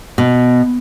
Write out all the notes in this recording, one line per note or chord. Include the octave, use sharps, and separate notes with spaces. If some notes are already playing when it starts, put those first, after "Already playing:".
B2